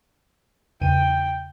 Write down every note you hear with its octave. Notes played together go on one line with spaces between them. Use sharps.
E2 C#3 G5 D#7